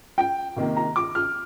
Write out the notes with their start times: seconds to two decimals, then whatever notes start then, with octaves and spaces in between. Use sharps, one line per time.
0.18 G5
0.56 C3 D#3 A#3
0.76 A#5
0.96 D6
1.15 F6